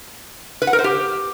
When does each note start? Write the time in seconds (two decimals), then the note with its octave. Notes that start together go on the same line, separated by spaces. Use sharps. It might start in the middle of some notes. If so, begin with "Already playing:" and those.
0.62 B4
0.67 F#5
0.73 A#4
0.79 C5
0.84 G4